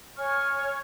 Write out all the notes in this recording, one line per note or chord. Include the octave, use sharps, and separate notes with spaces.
C#5 G#5 C#6 F6